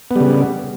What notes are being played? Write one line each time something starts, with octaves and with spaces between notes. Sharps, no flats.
C#3 G3 B3